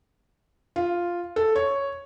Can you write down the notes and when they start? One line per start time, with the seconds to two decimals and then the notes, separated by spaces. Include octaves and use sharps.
0.76 F4
1.36 A4
1.56 C#5